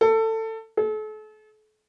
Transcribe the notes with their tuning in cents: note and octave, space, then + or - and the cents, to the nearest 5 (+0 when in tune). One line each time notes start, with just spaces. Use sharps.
A4 +20
A4 -40